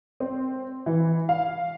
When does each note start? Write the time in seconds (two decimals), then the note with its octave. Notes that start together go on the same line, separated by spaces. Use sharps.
0.20 C4
0.86 E3
1.29 F5